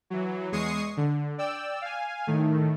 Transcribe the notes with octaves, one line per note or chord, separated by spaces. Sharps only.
E3 F#3
E2 G#3 C#6 D#6 C7
D3
D5 G5 E6
F5 G#5
A2 D#3 A3